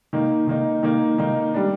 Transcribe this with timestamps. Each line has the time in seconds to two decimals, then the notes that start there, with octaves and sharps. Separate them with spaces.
0.13 D#3 A#3 D#4
0.47 D#3 A#3 D#4
0.83 D#3 A#3 D#4
1.18 D#3 A#3 D#4
1.54 G3 D4